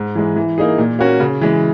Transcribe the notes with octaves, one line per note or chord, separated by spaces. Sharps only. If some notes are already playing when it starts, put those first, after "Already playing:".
Already playing: G#2
E3 G#3
E3
A#3 D#4 G#4
A#2
A#3 C#4 F#4
C#3
E3 G#3